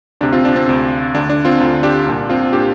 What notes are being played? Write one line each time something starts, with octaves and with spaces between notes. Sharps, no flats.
D2 C3 D4
C4 F4
D4
C4
D2 C3
D2 D3 D4
D4
C4 F4
D2 D3
D4 G4
C2 A#2 D4
C4 F4
A#2 D4 G4